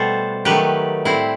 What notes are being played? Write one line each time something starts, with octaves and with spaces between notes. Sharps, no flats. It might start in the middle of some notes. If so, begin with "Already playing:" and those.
Already playing: B2 G3 A3 A4 C5
D#3 F#3 A3 G4 B4
A2 G3 C4 E4